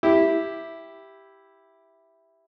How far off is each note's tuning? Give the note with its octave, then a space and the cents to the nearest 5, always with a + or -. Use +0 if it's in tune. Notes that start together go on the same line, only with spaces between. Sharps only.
E4 +0 G4 +0